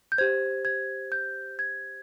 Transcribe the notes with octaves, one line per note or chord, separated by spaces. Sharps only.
G6
G4 C5 G#6
G#6
G6
G#6